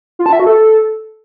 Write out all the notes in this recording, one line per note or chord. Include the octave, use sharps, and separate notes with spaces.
F4
A5
E5
F#4
A4